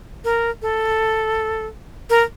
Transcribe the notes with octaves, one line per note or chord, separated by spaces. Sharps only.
A#4
A4
A#4